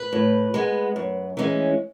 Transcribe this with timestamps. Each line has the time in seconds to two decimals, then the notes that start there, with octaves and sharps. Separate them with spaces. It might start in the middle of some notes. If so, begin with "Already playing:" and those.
Already playing: B4
0.13 A2
0.54 G#3 B3
0.96 F#2
1.37 E3 G#3 C#4